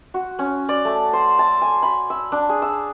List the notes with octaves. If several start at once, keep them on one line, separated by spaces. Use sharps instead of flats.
F#4
C#4
D5
A3
C5
A5
G#5
B5
E6
D4
G#4
E6